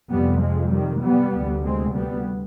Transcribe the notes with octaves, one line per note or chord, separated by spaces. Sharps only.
F2 C3 G3 B3
F3 G#3
D#3 G3
G3 B3
D2 C3
G#3 C4
G3 B3